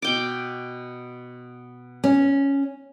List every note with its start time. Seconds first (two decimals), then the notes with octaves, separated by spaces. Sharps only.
0.02 B2 G5 D6
2.04 C#4